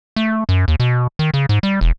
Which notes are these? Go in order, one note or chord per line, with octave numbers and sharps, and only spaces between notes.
A3
F#2
D#2
B2
D#3
C#3
G#2
G3
E1